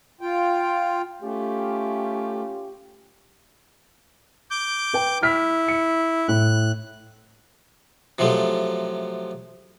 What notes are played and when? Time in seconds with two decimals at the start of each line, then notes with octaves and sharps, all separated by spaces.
0.21 F4 G5
1.22 A3 C#4 F4 G4
4.51 D6 G6
4.93 B4 G5
5.23 E4 F6 B6
5.68 C#7
6.28 A2 F#6
8.19 C3 F3 F#3 G#3 A3